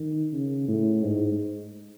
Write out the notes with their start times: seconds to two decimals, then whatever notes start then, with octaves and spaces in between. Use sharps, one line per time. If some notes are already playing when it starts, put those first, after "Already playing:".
Already playing: D#3
0.32 C#3
0.68 A2
1.03 G#2